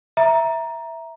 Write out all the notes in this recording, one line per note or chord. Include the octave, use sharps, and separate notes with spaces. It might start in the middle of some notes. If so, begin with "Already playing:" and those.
E5 A#5